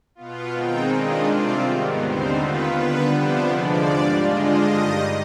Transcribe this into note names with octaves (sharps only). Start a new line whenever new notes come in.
B2 B3 F4
D#3 G#3 C4 D#4 G5
D#3 G#3 D4 F4 D#5
C3 G3 C4 F4 D5
G#2 D#3 B3
D#2 D3 G3 C4 D#4 C5
D#3 B3 F4 B4
D3 G3 B3 B4
C3 F3 B3 D4 C5
D#2 D3 F3 G#3 D5
G#2 G3 D4 F4
D3 G#3 D4 F4 D#5
G2 D#3 G3